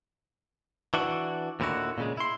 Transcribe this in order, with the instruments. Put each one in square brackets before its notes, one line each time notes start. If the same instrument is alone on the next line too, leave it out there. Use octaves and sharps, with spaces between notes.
[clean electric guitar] E3 D4 F#4
D#2 A#2 D3 E4 F#4
A#2 C#3 G#3
E4 C6